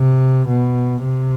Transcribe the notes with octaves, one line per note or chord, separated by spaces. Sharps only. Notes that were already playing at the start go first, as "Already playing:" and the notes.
Already playing: C3
B2
C3